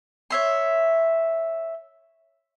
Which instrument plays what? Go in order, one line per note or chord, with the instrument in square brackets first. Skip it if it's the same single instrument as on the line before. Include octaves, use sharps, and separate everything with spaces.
[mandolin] C#5 E5 C6